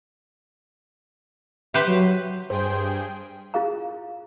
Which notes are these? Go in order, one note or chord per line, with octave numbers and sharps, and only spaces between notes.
G4 B4 C5 E5
F#3
G2 G#4 C5 G5
E4 F4 G#4 F5 A#5